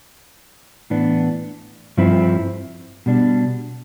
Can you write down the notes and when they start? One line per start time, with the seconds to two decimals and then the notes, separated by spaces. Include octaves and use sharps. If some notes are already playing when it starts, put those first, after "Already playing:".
0.90 A2 E3 B3 D4
1.97 G2 F3 C4 E4
3.06 B2 G3 D4